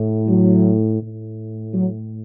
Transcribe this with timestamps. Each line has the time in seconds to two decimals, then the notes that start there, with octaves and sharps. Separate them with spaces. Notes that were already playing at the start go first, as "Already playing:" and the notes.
Already playing: A2
0.28 F#3
1.02 A2
1.74 F#3